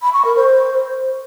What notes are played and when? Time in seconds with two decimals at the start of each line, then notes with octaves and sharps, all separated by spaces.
0.01 B5
0.13 C#6
0.24 A#4
0.36 C5